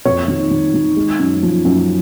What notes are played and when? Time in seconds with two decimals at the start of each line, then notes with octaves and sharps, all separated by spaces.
0.05 F2 C#5
0.28 D#3
0.51 D#3
0.74 D#3
0.96 G#3
1.19 F#2
1.43 F3
1.65 F#2